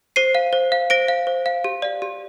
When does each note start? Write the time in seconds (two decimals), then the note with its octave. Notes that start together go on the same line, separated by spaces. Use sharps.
0.16 C5 C7 D#7
0.35 F5
0.53 C5
0.72 F5
0.90 C5 A#6 D7
1.08 F5
1.27 C5
1.46 F5
1.64 G4
1.82 D5 F5
2.02 G4